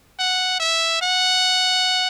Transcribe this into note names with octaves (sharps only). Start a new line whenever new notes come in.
F#5
E5
F#5